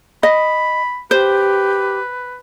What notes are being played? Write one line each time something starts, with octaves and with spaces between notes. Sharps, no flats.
D#5 B5
G4 B4 C5